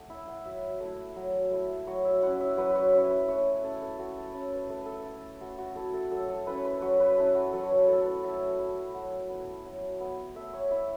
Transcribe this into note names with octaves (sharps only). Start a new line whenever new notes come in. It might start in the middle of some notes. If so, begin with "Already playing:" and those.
Already playing: A3 F#5
E4 E5
F#5
F#3 E5
A3 E4
F#3
A3 E4
F#3 C#5
E5
C#4 E4 F#5
E5
F#3 B4
B4
C#5
C#4 E4 C#5
B4
A3 C#5
C#4 E4 A4
A4
A3 F#4
A4
C#4 E4 A4
B4
A3 A4
B4
A4
E4
A3 F#4
F#4
E4 A4
A4
F#3 A4
A4
C#4 E4 B4
B4
F#3 C#5
B4
C#4 E4 A4
F#4
F#3 A4
C#5
B4
A3 E4 A4
B4
F#3 E5
A3 E4
F#3 F#5
B3 E4
F#3
B3 E4
A3 E5
C#5
E4 E5